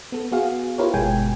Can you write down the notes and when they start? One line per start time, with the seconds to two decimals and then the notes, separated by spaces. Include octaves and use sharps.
0.12 B3 A4
0.32 B3 F#4 G#4 F5
0.78 E4 F4 G4 A#4 B4 C#5
0.94 G1 B2 G#3 G5 G#5